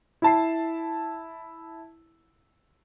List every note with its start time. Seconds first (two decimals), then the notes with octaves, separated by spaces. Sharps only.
0.22 E4 A5 C7